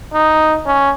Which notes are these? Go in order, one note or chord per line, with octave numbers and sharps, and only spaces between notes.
D#4
C#4